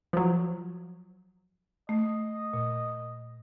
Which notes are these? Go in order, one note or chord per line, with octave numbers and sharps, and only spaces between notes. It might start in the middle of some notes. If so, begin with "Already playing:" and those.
F3 F#3
A3 D#5
A#2